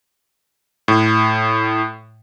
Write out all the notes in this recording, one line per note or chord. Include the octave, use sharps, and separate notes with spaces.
A2